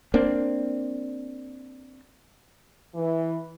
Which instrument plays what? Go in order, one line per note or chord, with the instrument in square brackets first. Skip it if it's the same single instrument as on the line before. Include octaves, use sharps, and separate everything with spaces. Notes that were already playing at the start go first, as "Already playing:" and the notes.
[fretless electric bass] A#3 C4 D4
[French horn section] E3